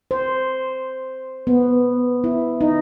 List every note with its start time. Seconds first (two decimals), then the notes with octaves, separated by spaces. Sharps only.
0.11 C5
1.47 B3
2.24 E4
2.61 D#4